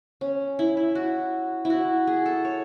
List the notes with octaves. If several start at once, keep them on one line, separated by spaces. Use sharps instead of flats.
C#4
E4
E4
F#4
E4
F#4
G#4
A4
C#5